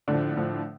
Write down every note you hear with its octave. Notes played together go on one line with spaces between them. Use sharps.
A2 D3 F3 D4
A2 F3